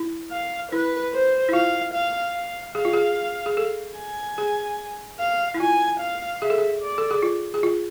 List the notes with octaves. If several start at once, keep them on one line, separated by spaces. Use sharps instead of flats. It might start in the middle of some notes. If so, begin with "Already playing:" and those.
Already playing: E4
F5
E4 B4
C5
E4
F4 F5
F5
F5
G#4 F5
F4
G#4
G#4
A4
G#5
G#4
F5
E4
F4 G#5
F5
G#4 E5
A4
G#4
D5
A4
G#4
F4
G#4
F4